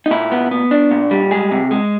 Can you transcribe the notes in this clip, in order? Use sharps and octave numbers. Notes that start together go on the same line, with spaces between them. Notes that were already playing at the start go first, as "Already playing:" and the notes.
D#4
A#2 E4
B3
B3
D4
A#2
G3
G#3 G#4
C3
G#3